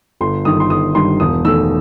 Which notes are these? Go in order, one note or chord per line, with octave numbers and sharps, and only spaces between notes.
G1 C6
G2 D#3 D#6
C6
G1 D#6
G2 D#3 C6
E1 D#6
E2 D#3 A3 E6